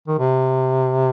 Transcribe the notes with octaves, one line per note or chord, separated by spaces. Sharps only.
D#3
C3